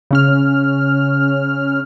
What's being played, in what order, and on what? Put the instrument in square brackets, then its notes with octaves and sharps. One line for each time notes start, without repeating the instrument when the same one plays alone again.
[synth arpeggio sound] C#3 C#4 F6